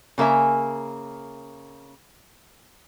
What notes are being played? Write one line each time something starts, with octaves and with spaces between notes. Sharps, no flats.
C#3 A#3 A#4 E5 G#5